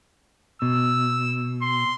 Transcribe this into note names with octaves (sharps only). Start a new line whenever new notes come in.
B2 E6
C6